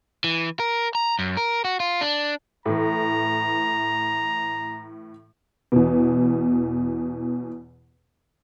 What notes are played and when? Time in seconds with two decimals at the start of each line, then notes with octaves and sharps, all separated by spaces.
0.24 E3
0.60 A#4
0.95 A#5
1.19 F#2
1.37 A#4
1.65 F#4
1.80 F4
2.01 D4
2.66 A2 E3 A#5
5.72 E2 B2